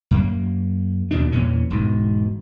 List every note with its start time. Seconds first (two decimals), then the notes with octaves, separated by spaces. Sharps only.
0.11 F#2 A#3
1.11 D#2 B2 D#3 D4
1.32 E2 A#2 E3 C#4
1.70 E1 G#2 B2